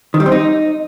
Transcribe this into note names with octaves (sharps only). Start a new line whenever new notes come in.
D#3
G3
C4
D#4